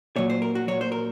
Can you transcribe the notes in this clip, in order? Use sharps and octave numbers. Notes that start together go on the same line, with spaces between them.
A#2 F#3 C#5
C5
A#4
F#4
A#2 F#3 C#5
C5
A#4